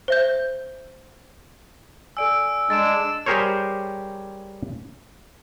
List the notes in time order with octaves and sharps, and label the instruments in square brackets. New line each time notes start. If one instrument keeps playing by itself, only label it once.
[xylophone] C5 E5 G6
[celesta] A4 D5 G#5 [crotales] E6 D7
[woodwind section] G#3 [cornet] D4 [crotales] A6 D7 E7
[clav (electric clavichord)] G3 G4 G#4 A#4 C5 C#5